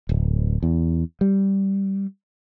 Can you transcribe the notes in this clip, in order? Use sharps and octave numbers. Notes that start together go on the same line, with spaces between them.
D1
E2
G3